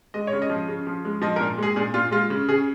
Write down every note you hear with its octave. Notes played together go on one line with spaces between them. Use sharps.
G#3 D#5
C#3 C#5
D#5
F3
C#3
F3
G#3
F3 D#5
A#4
A#2
G#3 G#4
A#2 G#4
A#2 F4
G#3 F4
C#3
C#3 G#4